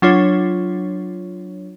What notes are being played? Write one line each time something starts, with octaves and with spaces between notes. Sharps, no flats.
F#3 D4 F4 C#5